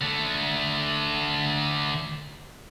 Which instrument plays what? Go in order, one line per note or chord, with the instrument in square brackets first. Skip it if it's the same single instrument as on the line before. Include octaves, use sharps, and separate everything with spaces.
[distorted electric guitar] D3 A3